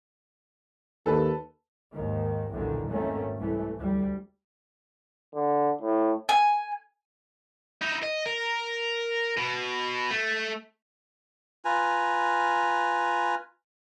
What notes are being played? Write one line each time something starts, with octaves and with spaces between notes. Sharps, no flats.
D#2 A4 B4 A5
D#2 G#2 D#3
B1 E2 G2 A#2 D3 D#3
G#1 D#3 A3 A#3 C#4
C2 C3 E3 A3
D2 G3
D3
A2
G#5
D#4 E4
D#5
A#4
B2
A3
F4 B4 G#5 A#5